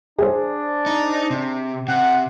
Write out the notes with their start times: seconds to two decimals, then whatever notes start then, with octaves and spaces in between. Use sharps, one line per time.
0.18 D4 G#4 C5
0.86 D#4
1.30 C3
1.88 C3 F#5